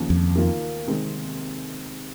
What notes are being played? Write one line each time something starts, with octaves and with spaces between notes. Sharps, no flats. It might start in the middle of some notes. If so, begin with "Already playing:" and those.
Already playing: D#2 C#3 F3
F2
D#3 A#3 F4
C3 D#3 G#3 C4